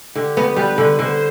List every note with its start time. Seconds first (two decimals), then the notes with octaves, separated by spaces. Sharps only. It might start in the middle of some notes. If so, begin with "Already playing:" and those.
0.15 D3 G4
0.37 B3
0.56 G3 B4
0.78 D3
0.98 D3 C5